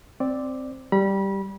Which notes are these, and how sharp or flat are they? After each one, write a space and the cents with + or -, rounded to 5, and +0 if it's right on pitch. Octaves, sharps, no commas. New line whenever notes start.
C4 +0 D5 +0
G3 +0 B5 -30